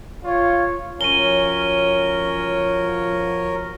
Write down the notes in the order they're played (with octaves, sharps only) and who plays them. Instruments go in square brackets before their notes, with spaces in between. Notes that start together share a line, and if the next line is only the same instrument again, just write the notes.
[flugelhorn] F4 [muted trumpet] C#5
[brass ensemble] F3 F#4 [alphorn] C#4 [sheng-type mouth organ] A#4 C#5 [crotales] D#7 G7